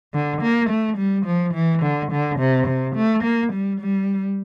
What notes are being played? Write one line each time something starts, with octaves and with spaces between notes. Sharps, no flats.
D3
A#3
A3
G3
F3
E3
D3
D3
C3
C3
A3
A#3
G3
G3